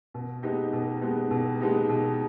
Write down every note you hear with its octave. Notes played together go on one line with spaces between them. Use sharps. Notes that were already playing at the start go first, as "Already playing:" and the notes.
B2
G#3 B3 D#4 G4
B2
G#3 B3 D#4 G4
B2
G#3 B3 D#4 G4
B2